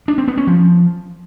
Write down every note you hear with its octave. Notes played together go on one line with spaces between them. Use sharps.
D4
C4
B3
C#4
F3